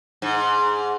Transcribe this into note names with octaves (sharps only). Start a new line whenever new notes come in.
G#2